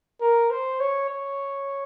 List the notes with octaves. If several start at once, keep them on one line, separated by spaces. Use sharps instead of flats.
A#4
C5
C#5
C#5